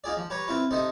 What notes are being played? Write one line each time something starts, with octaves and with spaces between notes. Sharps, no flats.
D#4 F4 G#4 D5
F3
G4 B4 C#5 A#5
C4 E4 F4 B4
C3 D#4 A4 C5 D#6